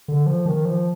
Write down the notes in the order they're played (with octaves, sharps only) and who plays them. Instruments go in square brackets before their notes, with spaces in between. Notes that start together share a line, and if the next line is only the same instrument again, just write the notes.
[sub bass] D3
F3
D#3
F3